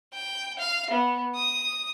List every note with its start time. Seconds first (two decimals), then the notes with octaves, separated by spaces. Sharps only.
0.13 G5
0.58 F5
0.90 B3
1.35 D#6